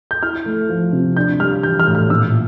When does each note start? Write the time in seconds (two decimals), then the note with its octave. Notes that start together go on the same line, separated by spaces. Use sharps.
0.11 G6
0.23 E4 F6
0.46 A3
0.69 F3
0.93 C3
1.17 D4 G6
1.39 G3 F6
1.63 E3 G6
1.80 F6
1.86 A2
1.95 F6
2.10 A#2 E6